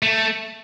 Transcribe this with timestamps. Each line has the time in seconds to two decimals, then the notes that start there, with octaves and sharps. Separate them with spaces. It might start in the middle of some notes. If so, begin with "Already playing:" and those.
0.03 A3